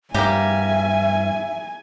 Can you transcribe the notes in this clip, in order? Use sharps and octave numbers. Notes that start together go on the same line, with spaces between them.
G2 A#3 G4 E5 G#5